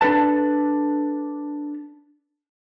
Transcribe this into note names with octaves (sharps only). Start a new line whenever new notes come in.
D4 A4 B4 A5